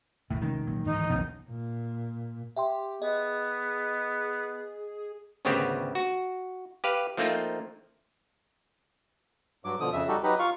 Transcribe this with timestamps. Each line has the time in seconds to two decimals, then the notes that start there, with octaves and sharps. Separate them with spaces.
0.30 E1 A2 D#3
0.42 C3 D#3 G#3 C#4
0.67 A#2 F#3 A#3
0.85 D1 G#2 E3 D#4
1.10 F1 A#1 F#2 B2 E3 F3
1.50 A#2
2.57 G4 E5 G5 C6
3.02 B3 G#4 D#5
5.45 G#1 D2 C#3 B3 C4 G4
5.95 F#4
6.84 G4 B4 F5
7.17 F3 A3 A#3 C4 D#4 F4
9.65 G2 F#3 D6
9.80 B2 D3 F3 D#6
9.93 F2 C#3 E5
10.08 G3 D#4 F#4 G4 A4
10.23 F#3 D#4 G4 B4
10.39 F4 F5 C#6